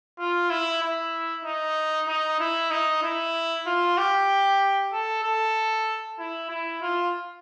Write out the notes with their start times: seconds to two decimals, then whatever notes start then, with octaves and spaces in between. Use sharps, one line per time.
0.19 F4
0.50 E4
0.82 E4
1.45 D#4
2.08 D#4
2.40 E4
2.71 D#4
3.03 E4
3.67 F4
3.98 G4
4.93 A4
5.24 A4
6.19 E4
6.50 E4
6.82 F4